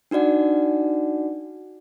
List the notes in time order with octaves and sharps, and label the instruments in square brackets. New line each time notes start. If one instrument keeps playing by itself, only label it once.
[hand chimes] D4 D#4 F#4 D5 F#5